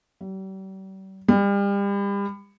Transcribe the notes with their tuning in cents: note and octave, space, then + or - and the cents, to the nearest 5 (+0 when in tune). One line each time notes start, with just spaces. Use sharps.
G3 -40
G3 +35